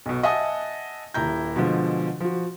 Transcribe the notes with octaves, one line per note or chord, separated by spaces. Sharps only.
B1 B2
D#5 E5 F#5 G#5 A5 D#6
D#1 E4 A#5 G6
B2 D3 F3 G#3
F3 F#4